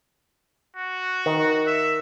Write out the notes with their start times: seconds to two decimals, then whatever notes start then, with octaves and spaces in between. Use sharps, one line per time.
0.76 F#4
1.26 D#3
1.67 E5